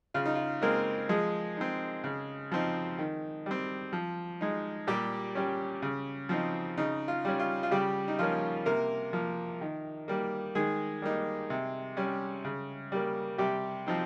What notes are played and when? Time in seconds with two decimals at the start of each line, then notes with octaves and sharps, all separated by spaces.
0.14 C#3 F4
0.26 D#4
0.35 F4
0.62 G#3 A#3 C4 A#4
1.09 F3 G#3 G#4
1.57 C4 D#4
2.04 C#3
2.52 F3 C4 D#4
2.99 D#3
3.46 G3 C4
3.93 F3
4.41 G#3 D#4
4.87 A#2 G3 G4
5.35 G3 C#4
5.82 C#3
6.29 F3 C4 D#4
6.78 C#3 D#4
7.08 F4
7.25 G3 C#4
7.39 F4
7.63 F4
7.71 C#3 G3 G4
8.08 D#4
8.19 F3 A#3 C#4 F4
8.66 C3 A#3 A#4
9.13 F3 A#3
9.61 D#3
10.08 G3 A#3
10.55 D#3 G#3 G#4
11.02 G3 A#3 D#4
11.50 C3
11.97 G3 C#4
12.45 C#3
12.92 G3 A#3
13.38 C3 G3 G4
13.87 F3 C4 D#4